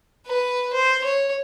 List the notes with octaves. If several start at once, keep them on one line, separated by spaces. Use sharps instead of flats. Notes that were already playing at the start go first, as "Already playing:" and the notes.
B4
C5
C#5